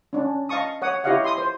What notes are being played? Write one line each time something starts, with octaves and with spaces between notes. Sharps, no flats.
C#4 D4
D#5 F5 A5 C#6 D#6
C#5 F#5 D#6
E4 G4 C#5 D#5 F5 F#5
C6 D#6
C5